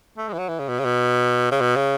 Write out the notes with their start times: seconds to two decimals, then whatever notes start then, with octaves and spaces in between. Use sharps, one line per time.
0.18 A3
0.28 G#3
0.33 E3
0.39 F#3
0.48 E3
0.59 C#3
0.68 B2
0.79 C#3
0.85 B2
1.51 C#3
1.61 B2
1.76 C#3